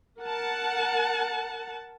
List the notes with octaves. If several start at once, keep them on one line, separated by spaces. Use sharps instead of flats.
A#4 F#5 A5